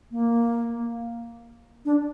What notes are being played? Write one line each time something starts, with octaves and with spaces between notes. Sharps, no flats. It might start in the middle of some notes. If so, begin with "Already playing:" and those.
A#3
D4